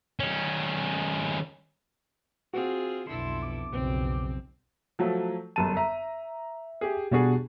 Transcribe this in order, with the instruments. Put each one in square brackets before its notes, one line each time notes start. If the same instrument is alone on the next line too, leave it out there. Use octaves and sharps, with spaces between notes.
[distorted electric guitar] D#3 C#4
[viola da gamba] C4 F4 G#4 [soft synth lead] F#4
[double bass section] B1 F2 B2 [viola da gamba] D3 E4 A4 [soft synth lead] C6
[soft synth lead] D6
[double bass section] B1 F2 C#3 [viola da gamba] C4
[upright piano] F3 F#3 A3
[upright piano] G1 F#2 D#7 [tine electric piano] A5
[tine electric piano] E5 [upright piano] A#5
[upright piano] G4 G#4
[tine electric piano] B2 B3 F#4 [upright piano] G3 D4 G#4